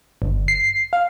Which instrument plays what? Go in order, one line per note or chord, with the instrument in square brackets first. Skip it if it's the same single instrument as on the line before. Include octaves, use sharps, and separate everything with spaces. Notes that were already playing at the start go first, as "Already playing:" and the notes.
[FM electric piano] G1
C7
F5